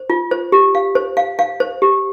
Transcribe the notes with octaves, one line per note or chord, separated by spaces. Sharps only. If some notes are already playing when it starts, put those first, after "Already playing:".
Already playing: C5
F4
C5
G4
F5
C5
F5
F5
C5
G4